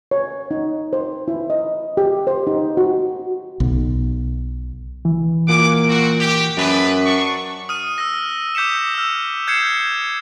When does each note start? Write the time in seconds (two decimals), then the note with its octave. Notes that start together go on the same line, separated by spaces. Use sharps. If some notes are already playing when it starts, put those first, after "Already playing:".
0.11 C#5
0.51 D#4
0.93 C5
1.28 E4
1.50 D#5
1.97 G4
2.27 C5
2.47 D#4
2.77 F#4
3.60 B1
5.05 E3
5.48 A#2 F#5 G#5 D6
5.88 C4 F#4
6.20 G4
6.57 F#2 D4 G#4 B4
7.06 D4 C#6
7.69 D#6 F6 D#7
7.98 E6 F6 A#6
8.55 D6 G6 B6 C#7 E7
8.95 E6 F6
9.47 F6 G6 G#6 C7 C#7 E7